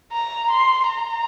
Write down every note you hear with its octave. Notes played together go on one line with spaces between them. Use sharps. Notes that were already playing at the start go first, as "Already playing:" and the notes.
A#5
C6
A#5